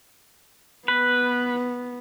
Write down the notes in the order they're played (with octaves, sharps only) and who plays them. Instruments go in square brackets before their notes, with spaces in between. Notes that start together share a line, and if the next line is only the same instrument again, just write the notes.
[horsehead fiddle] B3 [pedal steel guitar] B4